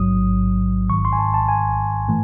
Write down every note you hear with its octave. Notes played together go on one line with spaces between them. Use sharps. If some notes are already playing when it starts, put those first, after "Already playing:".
Already playing: A1 G#2 F#3 D#6
G#1 G#2 D#3 C#6
C6
G#5
A5
A5
G#5
A2 E3 A3